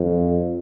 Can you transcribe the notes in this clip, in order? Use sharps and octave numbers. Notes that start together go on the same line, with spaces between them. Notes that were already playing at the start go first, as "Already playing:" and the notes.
Already playing: F2